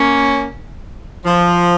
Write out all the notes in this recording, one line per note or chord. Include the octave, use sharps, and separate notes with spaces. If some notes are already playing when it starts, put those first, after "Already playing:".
Already playing: A#3 C#4
F3